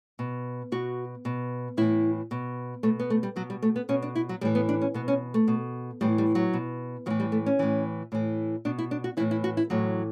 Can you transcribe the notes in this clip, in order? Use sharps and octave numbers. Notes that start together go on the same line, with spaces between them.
B2
B2 F#4
B2
A2 E3 E4
B2
B2 A3
B3
A3
G3
B2 F#3
G3
A3
B3
B2 C#4
D4
E4
F#3
A2 E3 G3
B3
D4
C#4
B2 B3
C#4
A3
B2
A2 E3 G3
G3
F#3
B2
A2 E3 F#3
G3
A3
C#4
A2 E3
A2 E3
B2 D4
E4
D4
F#4
A2 E3 E4
E4
F#4
E4
A2 E3 F#3